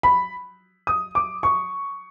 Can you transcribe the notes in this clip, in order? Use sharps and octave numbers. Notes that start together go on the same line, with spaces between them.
B5
D#6
D6
C#6